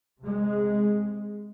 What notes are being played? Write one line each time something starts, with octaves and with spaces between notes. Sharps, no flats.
C3 G#3